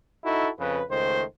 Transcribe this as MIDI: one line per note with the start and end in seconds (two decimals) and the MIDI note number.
0.25 0.49 63
0.25 0.49 64
0.25 0.49 66
0.25 0.49 69
0.59 0.82 41
0.59 0.82 49
0.59 0.82 71
0.91 1.25 37
0.91 1.25 51
0.91 1.25 57
0.91 1.25 72